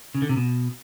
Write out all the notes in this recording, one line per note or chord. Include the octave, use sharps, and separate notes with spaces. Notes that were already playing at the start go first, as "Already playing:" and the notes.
C#3
D3
C3
B2